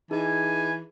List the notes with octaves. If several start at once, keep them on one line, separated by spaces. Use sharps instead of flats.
E3 D#4 G#4 G#5